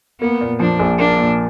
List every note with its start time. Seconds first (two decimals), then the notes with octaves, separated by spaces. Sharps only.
0.21 A#3 B3
0.41 A#2
0.60 F3 D4
0.80 A#1
0.99 A#3 D4
1.18 A#2